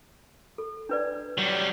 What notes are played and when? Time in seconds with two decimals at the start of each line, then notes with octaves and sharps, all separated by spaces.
0.58 A4
0.89 D4 B4 D5
1.38 F#3 G3